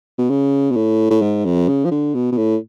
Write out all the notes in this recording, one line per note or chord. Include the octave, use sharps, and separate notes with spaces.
B2
C#3
B2
A2
A2
G#2
F2
C#3
F3
D3
B2
B2
A2